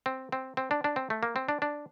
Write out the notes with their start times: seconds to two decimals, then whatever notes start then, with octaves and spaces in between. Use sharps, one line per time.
0.06 C4
0.32 C4
0.57 C4
0.71 D4
0.84 D4
0.96 C4
1.10 A3
1.23 A#3
1.36 C4
1.49 D4
1.62 D4